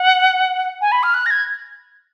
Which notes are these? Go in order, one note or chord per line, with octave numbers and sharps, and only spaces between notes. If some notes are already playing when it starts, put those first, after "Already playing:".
Already playing: F#5
G#5
B5
F6
F#6
A#6
G#6